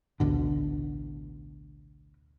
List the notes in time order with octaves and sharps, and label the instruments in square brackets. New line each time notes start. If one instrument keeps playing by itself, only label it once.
[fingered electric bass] A1 D2 B2 D3